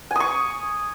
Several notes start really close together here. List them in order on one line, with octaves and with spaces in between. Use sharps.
G#5 D#6 C#6